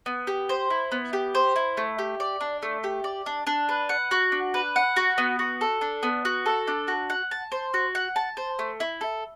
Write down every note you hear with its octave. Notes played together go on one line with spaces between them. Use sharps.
B3
G4
C5
E4
B3
G4
C5
E4
A3
G4
D5
D4
A3
G4
D5
D4
D4
B4
F#5
F#4
D4
B4
F#5
F#4
B3
F#4
A4
D4
B3
F#4
A4
D4
F#4
F#5
A5
C5
F#4
F#5
A5
C5
A3
E4
A4